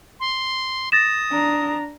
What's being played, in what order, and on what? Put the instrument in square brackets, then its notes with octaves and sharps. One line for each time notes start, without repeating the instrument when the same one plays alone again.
[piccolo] C6
[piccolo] D#6 [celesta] A6 A#6 E7
[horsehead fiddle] D4 A#5